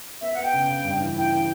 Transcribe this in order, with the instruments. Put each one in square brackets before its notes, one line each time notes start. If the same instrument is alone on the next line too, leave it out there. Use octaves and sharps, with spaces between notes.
[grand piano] B3 [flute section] E5
[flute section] F#5
[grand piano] B3 [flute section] G5
[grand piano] C#3
C#3
G2
E3
[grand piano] E4 [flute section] G5
[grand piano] E3